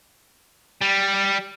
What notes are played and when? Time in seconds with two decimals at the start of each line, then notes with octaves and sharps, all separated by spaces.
0.82 G3